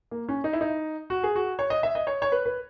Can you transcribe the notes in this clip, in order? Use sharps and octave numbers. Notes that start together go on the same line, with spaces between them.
A#3
C#4
D#4
E4
D#4
F#4
G#4
F#4
C#5
D#5
E5
D#5
C#5
C#5
B4
B4